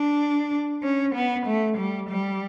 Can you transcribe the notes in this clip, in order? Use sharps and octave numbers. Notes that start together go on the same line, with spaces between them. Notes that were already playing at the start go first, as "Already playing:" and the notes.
Already playing: D4
C#4
B3
A3
G3
G3